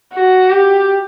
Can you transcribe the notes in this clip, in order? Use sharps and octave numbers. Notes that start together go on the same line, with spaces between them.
F#4
G4